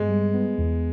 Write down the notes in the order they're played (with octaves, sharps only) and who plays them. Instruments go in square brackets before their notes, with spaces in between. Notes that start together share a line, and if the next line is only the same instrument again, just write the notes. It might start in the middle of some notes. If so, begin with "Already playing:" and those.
Already playing: [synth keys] G2 B3 [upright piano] G#3
[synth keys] G3
B3
E2